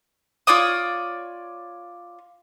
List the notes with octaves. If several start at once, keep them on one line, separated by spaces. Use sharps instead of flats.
F4 C#5 D5 D#6